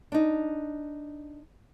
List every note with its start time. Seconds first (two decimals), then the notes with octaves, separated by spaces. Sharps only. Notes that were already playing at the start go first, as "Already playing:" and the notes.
0.12 D4 D#4